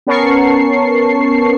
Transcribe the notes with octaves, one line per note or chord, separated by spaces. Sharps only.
B3 C#4 A#4 A5 C#6 C7